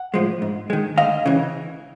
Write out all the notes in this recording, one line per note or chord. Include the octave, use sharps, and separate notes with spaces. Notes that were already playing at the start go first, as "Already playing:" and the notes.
Already playing: F#5
A2 F3 G#3
G#2
D#3 G#3
D2 D#5 F5
C#3 E3